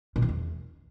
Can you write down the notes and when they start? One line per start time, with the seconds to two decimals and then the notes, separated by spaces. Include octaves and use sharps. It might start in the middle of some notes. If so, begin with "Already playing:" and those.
0.16 A#2
0.22 E3
0.29 E2